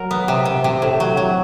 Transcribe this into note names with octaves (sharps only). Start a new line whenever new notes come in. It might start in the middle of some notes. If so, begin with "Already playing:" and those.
Already playing: F#3 A#4
B3
C3
C3
C3
A2
F#3
F#3